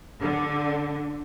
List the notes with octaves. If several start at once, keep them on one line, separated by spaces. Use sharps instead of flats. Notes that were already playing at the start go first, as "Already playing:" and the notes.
D3